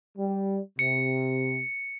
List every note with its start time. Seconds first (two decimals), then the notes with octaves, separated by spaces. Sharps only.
0.18 G3
0.79 C3 C#7